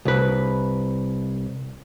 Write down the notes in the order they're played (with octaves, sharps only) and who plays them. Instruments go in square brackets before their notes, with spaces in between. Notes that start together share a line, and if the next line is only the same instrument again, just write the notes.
[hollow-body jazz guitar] C2 B4